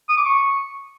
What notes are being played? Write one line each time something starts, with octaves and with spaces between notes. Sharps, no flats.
D#6
D6
C#6